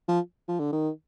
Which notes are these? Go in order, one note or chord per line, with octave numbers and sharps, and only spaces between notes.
F3
F3
D3
D#3